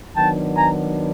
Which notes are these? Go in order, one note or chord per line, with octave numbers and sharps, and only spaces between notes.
D#3 F#3 B3 D4 G5 A5
G#5 A#5